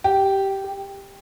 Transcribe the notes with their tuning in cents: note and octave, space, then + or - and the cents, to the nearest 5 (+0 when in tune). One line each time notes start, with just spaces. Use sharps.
G4 -10
G4 +10